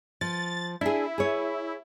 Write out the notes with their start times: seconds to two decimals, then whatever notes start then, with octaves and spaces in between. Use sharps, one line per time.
0.21 F3 A6
0.81 D4 E4 G#4
1.18 G#4 C#5